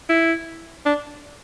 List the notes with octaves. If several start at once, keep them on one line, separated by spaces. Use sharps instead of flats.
E4
D4